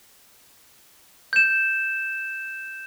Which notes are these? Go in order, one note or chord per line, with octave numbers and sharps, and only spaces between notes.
G6 E7